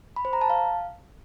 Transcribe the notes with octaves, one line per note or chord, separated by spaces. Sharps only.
B5
C5
A#5
A5
F5